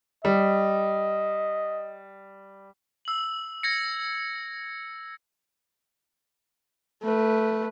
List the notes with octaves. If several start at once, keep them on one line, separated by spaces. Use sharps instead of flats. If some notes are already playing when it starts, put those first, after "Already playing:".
G3 D#5
E6 F#7
G#6 A#6 C#7
A3 B4